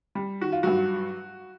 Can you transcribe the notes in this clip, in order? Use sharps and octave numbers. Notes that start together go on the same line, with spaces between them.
G3
D#3 F#4
F4
G2 F#3 F#4